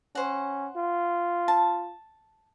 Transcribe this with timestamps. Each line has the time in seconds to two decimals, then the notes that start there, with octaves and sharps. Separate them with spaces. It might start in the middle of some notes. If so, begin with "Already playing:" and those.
0.15 C#4 C5 F#5
0.76 F4
1.48 A5